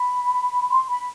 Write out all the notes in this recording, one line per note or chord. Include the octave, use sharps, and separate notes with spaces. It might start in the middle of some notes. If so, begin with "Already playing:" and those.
Already playing: B5
C6
B5